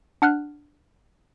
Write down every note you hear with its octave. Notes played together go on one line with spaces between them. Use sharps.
D4 F#5 F6 F#6